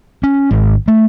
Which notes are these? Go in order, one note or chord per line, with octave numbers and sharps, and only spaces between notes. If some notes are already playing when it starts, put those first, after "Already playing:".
C#4
G#1
A3